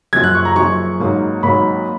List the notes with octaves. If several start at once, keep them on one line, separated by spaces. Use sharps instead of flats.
F#1 F#2 F3 G#6
F#6
C#6
A#5
F#1 F#2 F3 C#6
G#1 G#2 F#3 A#3
G#1 G#2 F#3 A#3 B5